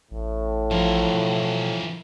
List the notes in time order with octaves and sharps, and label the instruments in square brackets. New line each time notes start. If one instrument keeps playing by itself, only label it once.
[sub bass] A1 [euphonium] A2
[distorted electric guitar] E3 A#4 [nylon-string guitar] F3
[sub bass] B2